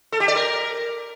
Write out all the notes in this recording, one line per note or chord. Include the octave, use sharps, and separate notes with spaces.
A4
G4
D5
A#4